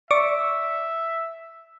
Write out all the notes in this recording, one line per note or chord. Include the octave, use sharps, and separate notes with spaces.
D5 E5 C#6 D6